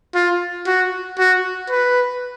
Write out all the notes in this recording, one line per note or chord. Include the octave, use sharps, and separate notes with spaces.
F4
F#4
F#4
B4